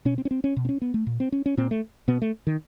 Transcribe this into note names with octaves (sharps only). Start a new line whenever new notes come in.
B2 C#4
C4
C#4
C4
C#4
B2
C4
C#4
B3
A3
A#2
C4
C#4
C#4
A#2 C4
A3
B2 B3
A3
D#3